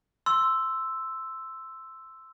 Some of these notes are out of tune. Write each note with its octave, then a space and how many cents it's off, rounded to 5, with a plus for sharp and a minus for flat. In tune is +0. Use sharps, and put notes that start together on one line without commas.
C6 +0 E6 +0